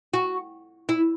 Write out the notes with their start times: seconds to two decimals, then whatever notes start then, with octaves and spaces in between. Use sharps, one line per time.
0.14 F#4
0.89 E4